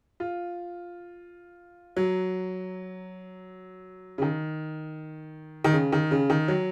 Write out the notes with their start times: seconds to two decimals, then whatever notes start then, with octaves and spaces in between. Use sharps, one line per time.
0.20 F4
1.97 F#3
4.18 C#3
4.22 D#3
5.64 D#3
5.73 C#3
5.92 D#3
6.11 C#3
6.30 D#3
6.48 F#3